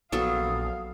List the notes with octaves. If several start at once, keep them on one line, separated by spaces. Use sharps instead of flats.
A#1 F#3 B3 A4 F5 D#6